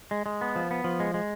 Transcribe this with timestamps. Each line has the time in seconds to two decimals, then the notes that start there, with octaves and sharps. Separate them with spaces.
0.11 G#3
0.26 G#3
0.41 B3
0.56 F3
0.71 B3
0.84 F3
1.00 G#3
1.14 G#3